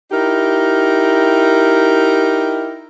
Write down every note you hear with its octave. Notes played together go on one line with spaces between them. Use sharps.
D#4 E4 G4 A#4